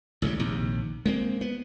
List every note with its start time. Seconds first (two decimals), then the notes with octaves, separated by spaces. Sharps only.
0.22 A1 C#3 F3 G3
0.39 A#1 D#2 C3
1.06 G#3 A#3 C4
1.41 B3